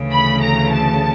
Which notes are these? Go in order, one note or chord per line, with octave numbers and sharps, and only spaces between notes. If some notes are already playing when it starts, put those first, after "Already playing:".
Already playing: D2 C#3 E3 A3
B5
A#5
A5